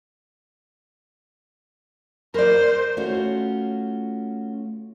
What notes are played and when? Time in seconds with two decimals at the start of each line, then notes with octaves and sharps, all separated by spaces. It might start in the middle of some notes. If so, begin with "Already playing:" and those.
2.34 A#4 C5 D5
2.97 A3 C#4 F4 F#4 C#5